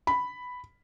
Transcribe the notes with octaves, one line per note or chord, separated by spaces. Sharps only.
B5